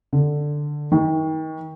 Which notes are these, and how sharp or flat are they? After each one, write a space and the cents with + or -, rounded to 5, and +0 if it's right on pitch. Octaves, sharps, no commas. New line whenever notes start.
D3 +5
D#3 +30